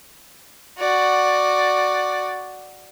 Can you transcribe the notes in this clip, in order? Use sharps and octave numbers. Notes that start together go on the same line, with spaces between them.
F#4 D5